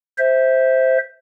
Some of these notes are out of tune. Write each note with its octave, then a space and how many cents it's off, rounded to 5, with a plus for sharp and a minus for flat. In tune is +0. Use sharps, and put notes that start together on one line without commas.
C5 +0 E5 -15